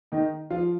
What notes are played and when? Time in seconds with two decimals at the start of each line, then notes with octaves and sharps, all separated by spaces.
0.12 D#3 D#4
0.50 F3 F4